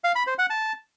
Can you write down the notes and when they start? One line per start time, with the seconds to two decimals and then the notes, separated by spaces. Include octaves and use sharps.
0.04 F5
0.15 B5
0.27 C5
0.38 F#5
0.50 A5